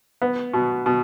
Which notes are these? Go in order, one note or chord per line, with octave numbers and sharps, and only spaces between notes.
B3
B2
B2